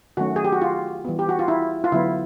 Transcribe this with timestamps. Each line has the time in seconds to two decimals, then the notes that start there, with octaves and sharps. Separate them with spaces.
0.17 D#3 F#3 A3 C#4 F#4
0.36 G#4
0.45 G4
0.52 F#4
0.62 F4
1.05 E3 G3 B3
1.19 G4
1.29 F#4
1.39 F4
1.48 E4
1.84 F4
1.92 D3 F#3 B3 E4